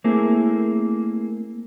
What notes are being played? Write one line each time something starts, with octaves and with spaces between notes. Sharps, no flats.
A3 A#3 C4 E4 G#4